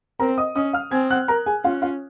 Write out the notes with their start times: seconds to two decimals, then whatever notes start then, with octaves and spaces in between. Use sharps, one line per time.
0.19 C4 A#4 A#5
0.38 D#5 D#6
0.56 C#4 D#5 D#6
0.73 F5 F6
0.91 C4 G#5 G#6
1.10 F#5 F#6
1.28 A#4 A#5
1.46 G#4 G#5
1.64 C#4 F4 F5
1.82 F4 F5